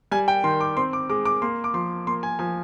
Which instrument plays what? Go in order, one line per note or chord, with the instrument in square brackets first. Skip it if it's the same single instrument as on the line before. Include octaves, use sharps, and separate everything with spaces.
[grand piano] G3 G#5
G5
D#3 C6
D6
C4 C6
D6
G#3 D6
D6
A#3 C6
D6
F3 C6
A#3 C6
G#5
F3 G#5